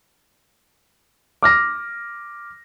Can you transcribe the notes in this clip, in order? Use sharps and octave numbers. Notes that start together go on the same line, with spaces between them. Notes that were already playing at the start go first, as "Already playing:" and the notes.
D6 F6 A#6